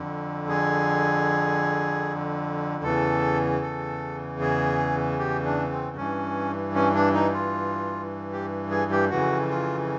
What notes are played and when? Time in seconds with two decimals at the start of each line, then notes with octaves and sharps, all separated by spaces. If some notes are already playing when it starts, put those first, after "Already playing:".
Already playing: F2 D3
0.49 G#4
2.83 E2 C#3 E3 A4
3.62 A4
4.41 G#4
5.19 G4
5.45 D4
5.71 C4
5.96 G2 E3 C#4
6.75 C#4
6.95 D4
7.14 D#4
7.33 F4
8.32 G4
8.71 G#4
8.91 G4
9.10 F2 C#3 E3 F#4
9.50 F4